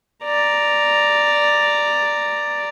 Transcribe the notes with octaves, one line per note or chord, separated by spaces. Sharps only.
D5 A#5